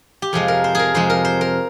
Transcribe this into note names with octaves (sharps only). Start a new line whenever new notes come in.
G4
F2 C3 F3 G#3 G#4
A#4
C5
G#4 A#4
F2 C3 F3 G#3 C5
A#4
C5
A#4